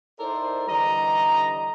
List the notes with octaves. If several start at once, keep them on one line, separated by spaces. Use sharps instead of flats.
D#4 E4 A4 A#4 C5 D5
D3 E3 G3 D#5 A#5